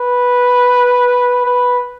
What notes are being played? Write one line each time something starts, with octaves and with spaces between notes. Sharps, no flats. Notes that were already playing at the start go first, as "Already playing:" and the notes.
Already playing: B4
B4